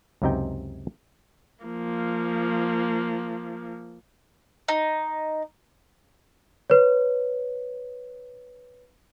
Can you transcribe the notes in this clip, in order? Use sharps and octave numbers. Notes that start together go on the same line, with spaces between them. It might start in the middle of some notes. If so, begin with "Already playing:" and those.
C#2 F#2 C3 D#4 G5
F3 A#3
D#4
B4 C#5